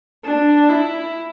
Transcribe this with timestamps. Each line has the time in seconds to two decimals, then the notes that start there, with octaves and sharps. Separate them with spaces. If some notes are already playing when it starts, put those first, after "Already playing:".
0.25 D4
0.69 E4